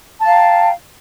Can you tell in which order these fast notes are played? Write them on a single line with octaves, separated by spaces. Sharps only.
A5 F5 A#5 G5